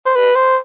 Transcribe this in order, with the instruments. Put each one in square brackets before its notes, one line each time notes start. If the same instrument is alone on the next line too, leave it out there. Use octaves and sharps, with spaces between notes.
[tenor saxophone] C5
B4
C5